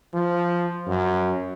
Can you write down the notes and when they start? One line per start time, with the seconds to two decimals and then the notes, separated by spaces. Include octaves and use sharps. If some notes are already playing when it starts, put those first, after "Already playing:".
0.14 F3
0.87 F#2